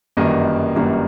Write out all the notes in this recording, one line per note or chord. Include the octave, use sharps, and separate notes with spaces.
G1 F#2 D#3 G3 A#3 D#5
G1 F#2 D#3 G3 A#3